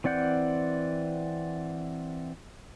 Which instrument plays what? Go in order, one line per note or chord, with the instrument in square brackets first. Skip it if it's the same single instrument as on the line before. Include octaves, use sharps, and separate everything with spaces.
[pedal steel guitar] E3 C4 D5 F#5 G6